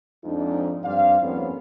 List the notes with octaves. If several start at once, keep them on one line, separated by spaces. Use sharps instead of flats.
F2 G#2 D4 D#4
G2 C4 D4 D5 F5
F2 G#2 A#3 B3 C#4